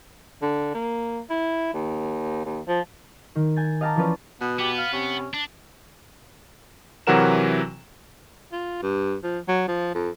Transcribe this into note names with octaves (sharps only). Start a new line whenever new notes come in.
D3
A#3
E4
D#2
D#2
F3
D#3
G#5 G6 A6
D#5 F5 G5 A5 A#5 D6
E3 F3 C#4 F4 B4 D5
B2 B3
B3 G4
F5
C3 C#4
D4
C3 E3 F#3 F#4 A#4 E7
F4
G2
F3
F#3
F3
F2